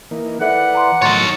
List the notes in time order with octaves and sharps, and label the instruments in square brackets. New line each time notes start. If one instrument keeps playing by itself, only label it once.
[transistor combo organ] E3 A#3 D#4
[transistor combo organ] E3 B4 D5 [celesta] A4 E5 [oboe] F#5
[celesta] A#5 C6 D6
[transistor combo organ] A2 D#3 F#3 [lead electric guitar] D#4 C#5 [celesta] C6 A6